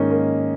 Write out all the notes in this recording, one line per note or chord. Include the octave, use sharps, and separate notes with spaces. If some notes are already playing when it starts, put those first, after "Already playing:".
Already playing: G#2 D#3 A#3 C#4 D#4
A#3